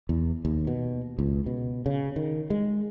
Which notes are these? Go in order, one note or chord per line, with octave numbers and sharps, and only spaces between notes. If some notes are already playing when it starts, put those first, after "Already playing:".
E2
D#2
B2
C#2
B2
C#3
D#3
G#3